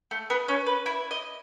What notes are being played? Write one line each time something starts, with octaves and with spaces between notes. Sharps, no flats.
A3
B3
C#4
B4
E4
D#5